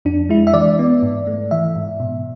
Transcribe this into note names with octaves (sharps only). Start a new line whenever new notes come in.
F2 D4
G#3 E4
E5
E3 D5
B3
G#2
A3
E3 E5
G#2
B2